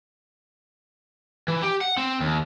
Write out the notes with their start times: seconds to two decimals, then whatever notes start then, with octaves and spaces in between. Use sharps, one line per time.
1.48 E3
1.62 G4
1.81 F#5
1.97 C4
2.20 D#2